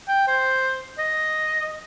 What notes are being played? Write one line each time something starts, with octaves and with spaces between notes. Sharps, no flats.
G5
C5
D#5